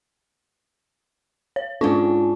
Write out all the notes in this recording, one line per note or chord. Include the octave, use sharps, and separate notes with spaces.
C#5
G#2 C#4 D4 F4